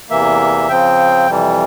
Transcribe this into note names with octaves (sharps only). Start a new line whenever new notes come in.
E2 C3 E3 A#3 E5
C#3 F3 C4 G5
F2 C3 E3 G3